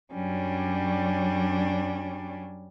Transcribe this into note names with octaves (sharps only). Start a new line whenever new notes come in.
F#2 F#3 G3 C#4 D4